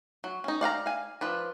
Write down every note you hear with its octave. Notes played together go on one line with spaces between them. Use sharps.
F#3
C#4 D#4
D5 F5 F#5 A#5
F5 G#5
F3 B4 D5